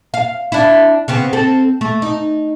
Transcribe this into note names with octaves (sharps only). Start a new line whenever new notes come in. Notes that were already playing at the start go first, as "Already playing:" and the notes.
F5
D4 E4
C#3 B3 C4
C4 A4
A3
D#4